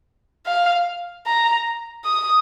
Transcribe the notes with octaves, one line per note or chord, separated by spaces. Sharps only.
F5
A#5
D#6